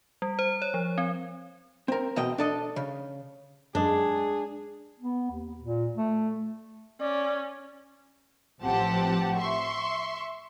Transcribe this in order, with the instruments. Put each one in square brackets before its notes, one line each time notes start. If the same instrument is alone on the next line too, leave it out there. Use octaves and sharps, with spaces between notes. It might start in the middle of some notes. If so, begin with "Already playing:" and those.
[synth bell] G3
C5
C#5
F3
C4
[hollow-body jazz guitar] C4 A#4
E2 B2 D#5 G5
D4 A4 D#5
C#3
[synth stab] F#2 G#3 [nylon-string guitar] D4 [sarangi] G#4
[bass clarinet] B3
D#2
A#2
A3
[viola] C#4 [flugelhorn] D5
[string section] A1 F3 C4 G4 F#5 A5
E5 C6 C#6